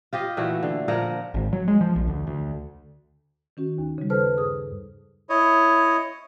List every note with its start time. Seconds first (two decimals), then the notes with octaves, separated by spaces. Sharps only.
0.13 F4 G4 D#5
0.37 A#2 E3 A3 F#4
0.63 D3
0.88 A#2 F3 A#4 F#5
1.34 G#1
1.53 F#3
1.68 G#3
1.81 F3
1.96 A#1
2.07 D2
2.27 D2
3.57 D#3 C#4 F#4
3.78 D#2
3.98 C#3 G3
4.10 A4 B4 C5 A5 F6
4.37 G2 G#4 D#6
5.29 E4 C#5 D#5